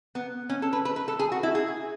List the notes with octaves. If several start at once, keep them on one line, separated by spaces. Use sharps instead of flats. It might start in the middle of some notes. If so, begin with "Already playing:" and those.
B3
C#4
A4
B4
B4
B4
A4
G#4
F#4
E4
G#4